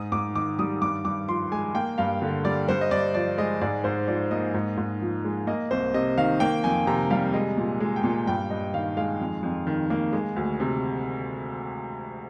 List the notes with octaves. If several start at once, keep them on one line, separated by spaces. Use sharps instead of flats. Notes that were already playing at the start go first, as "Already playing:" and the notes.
Already playing: G#2 D#6
G#2 D6
D#3 D6
G3 D#6
G2 D6
G2 D6
F3 C6
G#3 G#5
A#3 G5
G2 F5
D3
G3 D5
G2 C5
D#5
G2 D5
F3 D5
G#3 D#5
G#2 D5
G#2 C5
F3 D5
A#3 D#5
G#2
G#2
F3
G#3
A#3 D#5
C2 C5
C3 D#5
D#3 F5
A#3 G5
F2 G#5
C3 A#5
G3 F5
G#3 D#5
A#2
G#3
G5
A#2
G2 G5
G2 D#5
D#3 F5
G#3 F5
F2
F2
D#3
A#3
G#3
D2
C3